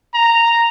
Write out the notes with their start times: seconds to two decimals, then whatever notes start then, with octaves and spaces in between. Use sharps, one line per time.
0.14 A#5